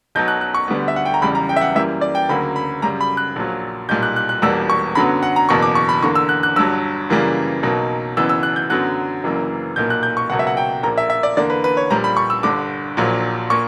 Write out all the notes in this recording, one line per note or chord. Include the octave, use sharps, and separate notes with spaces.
B1 B2 F#3 G6
F#6
F#6
C#6
D2 D3 G3 B3
E5
F#5
G5
A#5
F#1 E2 C#3 G3 B5
A#5
G5
E5
F#5
F#2 E3 G3 A#3 E5
D5
G5
D2 C#3 F#3 A#3 B5
B5
F#2 C#3 G3 A#5
B5
F#6
A#1 A#2 F#3
B1 A#2 G3 G6
F#6
F#6
F#6
E1 E2 B2 G3 A#3 E6
C#6
F#2 D3 F#3 B3 B5
F#5
A#5
F#1 E2 B2 A#3 C#6
D6
C#6
B5
E2 D3 A#3 C#6
E6
F#6
F#6
G1 G2 F#3 E6
F#2 C#3 E3 G3 A#3
B1 B2 F#3 A#3
F#1 F#2 E3 B3 E6
E6
F#6
G6
F#2 D3 F#3 B3 F#6
F#1 F#2 E3 A#3
B1 A#2 A#3 G6
F#6
G6
C#6
C#2 B2 F#3 A#3 F#5
E5
F#5
G5
A#1 A#2 A#3 A#5
E5
E5
D5
E2 D3 A#3 D5
B4
B4
C#5
A#1 A#2 G3 A#5
B5
C#6
E6
G1 G2 D3 D6
A#1 A#2 F#3
A#2 A#3 C#6